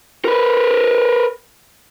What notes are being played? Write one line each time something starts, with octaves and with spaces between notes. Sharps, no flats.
A#4 B4